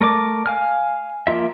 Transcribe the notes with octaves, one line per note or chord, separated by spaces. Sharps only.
A3 A#4 D5 D6
F5 G#5 F6
F3 A#3 F4 E5